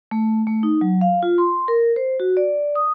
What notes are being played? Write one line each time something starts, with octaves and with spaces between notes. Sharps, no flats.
A3
A3
D#4
F#3
F5
F4
C6
A#4
C5
F#4
D5
D#6